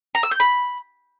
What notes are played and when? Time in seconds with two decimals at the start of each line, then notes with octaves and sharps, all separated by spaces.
0.15 A#5
0.23 E6
0.31 G6
0.40 B5